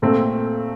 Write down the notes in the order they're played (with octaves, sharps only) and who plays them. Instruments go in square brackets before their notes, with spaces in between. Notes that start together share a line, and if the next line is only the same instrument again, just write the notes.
[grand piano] A#2 A3 C4